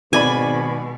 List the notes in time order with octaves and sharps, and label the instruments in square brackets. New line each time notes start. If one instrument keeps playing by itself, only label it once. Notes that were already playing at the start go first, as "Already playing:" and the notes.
[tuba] G#1 [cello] B2 [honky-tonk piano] D#3 D5 B5 [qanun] G#5